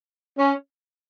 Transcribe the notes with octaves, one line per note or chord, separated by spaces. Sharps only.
C#4